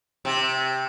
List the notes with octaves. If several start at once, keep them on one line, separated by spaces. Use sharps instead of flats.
C3